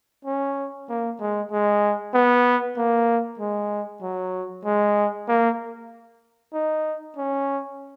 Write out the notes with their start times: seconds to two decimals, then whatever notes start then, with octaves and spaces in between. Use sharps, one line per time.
0.25 C#4
0.89 A#3
1.20 G#3
1.51 G#3
2.14 B3
2.77 A#3
3.40 G#3
4.02 F#3
4.65 G#3
5.28 A#3
6.54 D#4
7.17 C#4